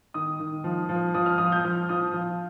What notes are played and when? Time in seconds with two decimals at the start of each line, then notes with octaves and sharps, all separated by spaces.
0.14 D#3 D#6
0.39 D#3
0.64 F3
0.89 F3
1.14 F3 D#6
1.26 F6
1.38 F3 D#6
1.52 G6
1.65 F3 F6
1.89 F3 D#6
2.14 F3